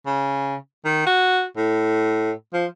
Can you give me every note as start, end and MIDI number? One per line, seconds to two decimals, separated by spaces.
0.06 0.56 49
0.85 1.04 51
1.06 1.44 66
1.57 2.32 45
2.53 2.66 53